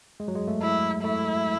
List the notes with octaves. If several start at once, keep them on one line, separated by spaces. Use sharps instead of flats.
G#3
F#3
G#3
A3
E4
A3 E4